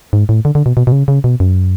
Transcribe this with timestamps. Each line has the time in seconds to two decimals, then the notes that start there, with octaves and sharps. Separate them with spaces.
0.13 G#2
0.29 A2
0.45 D3
0.55 D3
0.66 B2
0.77 B2
0.87 B2
0.92 C#3
1.08 C#3
1.24 B2
1.40 F#2